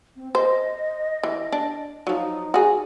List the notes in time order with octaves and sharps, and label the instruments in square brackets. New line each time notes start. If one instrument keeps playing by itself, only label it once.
[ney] C4
[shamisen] C5 [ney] D#5
[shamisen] E3
D4
[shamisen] F3 F#3 [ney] D#4
[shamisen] F#4 G#4